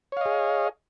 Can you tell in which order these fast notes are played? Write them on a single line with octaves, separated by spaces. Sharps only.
C#5 F5 D#5 G#4